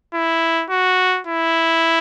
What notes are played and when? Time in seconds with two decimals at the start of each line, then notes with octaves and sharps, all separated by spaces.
0.14 E4
0.70 F#4
1.27 E4